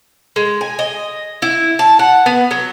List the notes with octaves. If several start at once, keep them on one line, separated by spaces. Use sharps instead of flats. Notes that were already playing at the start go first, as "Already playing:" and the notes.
G#3
G#5
D#5
E4
A5
F#5
B3
F#3